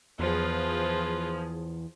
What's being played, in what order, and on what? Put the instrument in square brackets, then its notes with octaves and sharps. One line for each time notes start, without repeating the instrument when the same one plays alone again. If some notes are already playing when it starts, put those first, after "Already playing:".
[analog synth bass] E2 [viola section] F3 G#4 [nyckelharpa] F4 B4